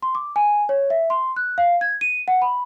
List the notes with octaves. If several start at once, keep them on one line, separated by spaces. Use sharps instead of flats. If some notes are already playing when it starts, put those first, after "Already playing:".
C6
D6
G#5
C#5
E5
C6
F#6
F5
G#6
D#7
F#5
B5